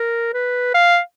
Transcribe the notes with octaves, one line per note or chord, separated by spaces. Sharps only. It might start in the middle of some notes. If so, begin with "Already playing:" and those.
Already playing: A#4
B4
F5